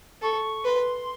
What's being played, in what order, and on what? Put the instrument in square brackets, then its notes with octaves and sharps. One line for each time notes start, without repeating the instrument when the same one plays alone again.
[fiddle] A4 [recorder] C#6
[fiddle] B4 [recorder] C6